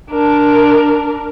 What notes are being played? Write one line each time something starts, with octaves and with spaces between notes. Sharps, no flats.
D4 A#4